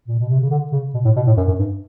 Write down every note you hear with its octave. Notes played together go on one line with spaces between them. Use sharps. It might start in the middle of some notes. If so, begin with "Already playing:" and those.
A#2
B2
C3
C#3
D3
C#3
B2
A2
B2
A2
F#2
F#2
G2